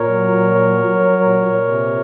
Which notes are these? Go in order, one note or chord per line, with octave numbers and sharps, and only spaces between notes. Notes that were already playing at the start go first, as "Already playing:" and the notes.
Already playing: A#2 A#4 C#5
F#3
A#2
F#3
F#3
F#3
A#2
A#2
C3